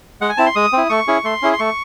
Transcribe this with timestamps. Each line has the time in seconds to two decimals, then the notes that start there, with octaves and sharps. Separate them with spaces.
0.21 G#3 F#5
0.29 G#5
0.37 C4 E4 A5
0.46 C6
0.55 G#3 D#6
0.73 C4 E4
0.89 A3 C#6
1.08 C#4 E4 G#4
1.24 A3 C6
1.42 C#4 E4 G#4
1.53 C6
1.59 A3 C#6